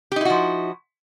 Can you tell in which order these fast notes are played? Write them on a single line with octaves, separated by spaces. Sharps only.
G4 D#4 E4 F#4 F3